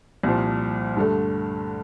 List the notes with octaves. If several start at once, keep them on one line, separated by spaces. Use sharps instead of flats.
C2 A#2 F3
G2 D3 A3